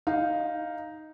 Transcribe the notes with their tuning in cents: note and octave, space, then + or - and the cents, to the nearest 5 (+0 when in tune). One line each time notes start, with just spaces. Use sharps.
D#4 +0 F5 +0